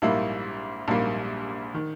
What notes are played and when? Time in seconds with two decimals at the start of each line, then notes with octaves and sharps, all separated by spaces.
0.02 A#1 G#2 G3 A#3 E4
0.88 A#1 G#2 G3 A#3
1.74 D#3